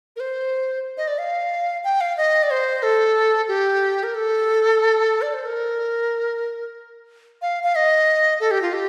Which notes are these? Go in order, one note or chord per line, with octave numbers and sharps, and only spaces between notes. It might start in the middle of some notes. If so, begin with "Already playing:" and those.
A#4
C5
D#5
D5
F5
G5
F5
D#5
D5
C5
A4
G4
A#4
A4
D5
C5
A#4
F5
F5
D#5
A4
G4
F4
G4